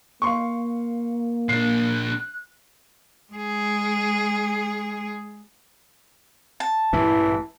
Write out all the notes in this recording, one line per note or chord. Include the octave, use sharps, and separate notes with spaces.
A#3 F5 C6 C#6
A#2 D4 F#6 C7
G#3 G#4
A5
A1 G2 A#2 E3